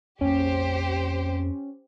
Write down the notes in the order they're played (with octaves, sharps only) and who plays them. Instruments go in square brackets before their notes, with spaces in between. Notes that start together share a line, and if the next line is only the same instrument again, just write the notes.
[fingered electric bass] F2 A#3 [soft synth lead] C#4 [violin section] G4 C5